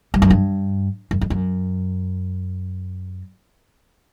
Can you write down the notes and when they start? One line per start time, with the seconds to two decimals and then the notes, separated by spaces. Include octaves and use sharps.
0.14 G2
0.22 F#2
0.30 G2
1.11 F#2
1.21 F2
1.30 F#2